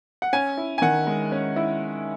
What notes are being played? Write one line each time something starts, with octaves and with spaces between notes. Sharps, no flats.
F#5
C#4 G#5
E4
G#5
D#3 F#5
G#3
C#4
E4